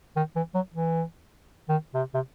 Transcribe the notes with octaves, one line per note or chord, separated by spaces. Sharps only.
D#3
E3
F#3
E3
D#3
C3
C3